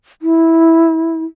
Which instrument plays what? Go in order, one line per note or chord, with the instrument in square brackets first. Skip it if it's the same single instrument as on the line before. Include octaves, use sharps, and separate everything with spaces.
[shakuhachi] E4